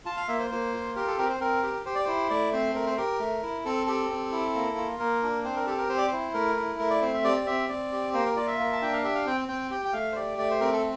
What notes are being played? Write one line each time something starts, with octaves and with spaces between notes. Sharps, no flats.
F4 A5
F5
A#3 E5
C5
A#3 C5
F4
G4 A#4
A4
C4 A#4
C5
C4 A#4
G4
G4 C5
D5
E4 C5
A3 D5
C4 C5
A3 A#4
C5
G4 A#4
A3
E4
C4 A4
G4 A4
C4
E4
A#3
F4
A#3 A#4
D4
C4 C5
A#4
G4 A4
A#4
C4 C5
D5
E4 C5
A3 A#4
E4
A3 A#4
D5
C4 C5
E5
G4 D5
D5
C4 E5
C4 D5
G4
A#3 C5
A#4
F4 D5
E5
A#3
A5
D4 G5
F5
G4 E5
F5
C4 G5
C4 G5
G4 G5
G5
A3 F5
C5
G4 D5
A3 D5
C5
C4 A#4
A4